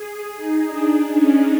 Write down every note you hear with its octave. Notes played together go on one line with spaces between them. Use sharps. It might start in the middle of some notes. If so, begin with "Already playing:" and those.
Already playing: G#4
D#4
D4
C#4